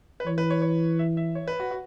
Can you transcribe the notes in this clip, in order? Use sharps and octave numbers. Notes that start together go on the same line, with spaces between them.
B4
E3 C#5
B4
C#5
C#5
E5
E5
C#5
B4
F#4
F#4